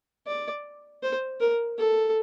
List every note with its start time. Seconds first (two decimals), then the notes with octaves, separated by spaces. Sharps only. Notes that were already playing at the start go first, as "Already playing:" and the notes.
0.27 D5
1.03 C5
1.40 A#4
1.78 A4